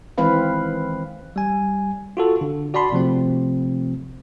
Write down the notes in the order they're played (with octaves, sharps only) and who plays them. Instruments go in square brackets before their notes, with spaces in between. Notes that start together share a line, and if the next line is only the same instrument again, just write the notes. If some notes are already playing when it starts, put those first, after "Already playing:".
[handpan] D#3 E3 G#3 C4 B4 F5
[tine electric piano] G3 G#5
F4 F#4 A4
D3
F#4 D5 A5 B5 C6
C3 F3 A3 C4